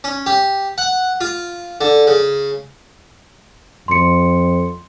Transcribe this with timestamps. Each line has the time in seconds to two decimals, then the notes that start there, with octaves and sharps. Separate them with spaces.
0.04 C#4
0.26 G4
0.78 F#5
1.21 F4
1.81 D3
2.07 C#3
3.88 F2 C6 C#7